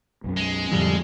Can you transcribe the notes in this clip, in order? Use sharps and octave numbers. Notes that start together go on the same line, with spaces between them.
B1 F#2 C#4
G#3
F2 A2 D3 G3